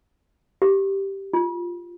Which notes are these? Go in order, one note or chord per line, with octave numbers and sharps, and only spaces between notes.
G4
F4